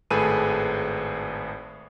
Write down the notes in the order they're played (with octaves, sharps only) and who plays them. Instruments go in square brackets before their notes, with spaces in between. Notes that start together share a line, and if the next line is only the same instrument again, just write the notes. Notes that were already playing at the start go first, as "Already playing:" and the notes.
[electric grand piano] G#1 A2 G#4 A4 B4 D#7